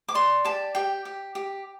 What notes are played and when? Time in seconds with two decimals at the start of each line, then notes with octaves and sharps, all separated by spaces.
0.08 D6
0.14 D5 C6
0.45 G4 A5
0.75 G4 G5
1.05 G4
1.35 G4